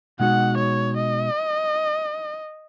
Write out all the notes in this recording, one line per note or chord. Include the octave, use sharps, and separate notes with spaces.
B2 G#3 D#4 F#4 F#5
C#5
D#5